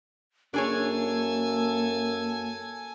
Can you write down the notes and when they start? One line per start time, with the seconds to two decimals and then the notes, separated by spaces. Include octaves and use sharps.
0.54 F#2 A#3 D4 G#4 A4 C#5 G#5